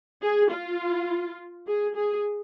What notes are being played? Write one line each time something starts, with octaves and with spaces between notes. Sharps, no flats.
G#4
F4
G#4
G#4